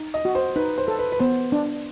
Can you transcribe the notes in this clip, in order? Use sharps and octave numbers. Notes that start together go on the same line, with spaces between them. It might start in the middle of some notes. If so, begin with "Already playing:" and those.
Already playing: D#4
D#5
F#4
C5
D#4 B4
C5
A4
B4
B4
B3 C5
D4